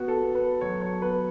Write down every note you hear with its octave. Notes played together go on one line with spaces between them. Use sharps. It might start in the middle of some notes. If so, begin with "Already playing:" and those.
Already playing: B3 F#4
A4
B3
B4
F#3 C#5
C#5
B3 B4